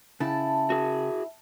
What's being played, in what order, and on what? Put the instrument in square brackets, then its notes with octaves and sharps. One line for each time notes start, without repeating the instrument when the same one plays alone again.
[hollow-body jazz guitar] C#3 [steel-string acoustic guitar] E4 G5 [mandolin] A5
[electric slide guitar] F#4 G#4